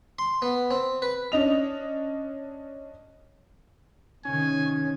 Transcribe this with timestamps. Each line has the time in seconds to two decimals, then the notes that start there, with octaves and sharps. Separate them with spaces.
0.19 C6
0.42 B3
0.71 C4
1.02 B4
1.32 C#4 D4 D#5 F7
4.25 C3 D#3 C#4 G#5